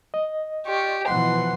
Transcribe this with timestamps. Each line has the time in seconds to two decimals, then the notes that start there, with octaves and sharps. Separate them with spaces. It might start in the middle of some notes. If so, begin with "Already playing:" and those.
0.14 D#5
0.66 F4 G4 D5 C#6
1.08 B2 E3 F3 F#5 C6